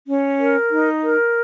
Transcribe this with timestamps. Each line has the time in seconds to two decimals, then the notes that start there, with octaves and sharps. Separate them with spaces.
0.06 C#4
0.39 A#4
0.70 D#4
1.03 A#4